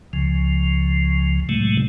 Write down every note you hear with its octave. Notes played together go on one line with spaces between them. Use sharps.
C#2 C#3 F3
A2 C3 F#3 G#3 A3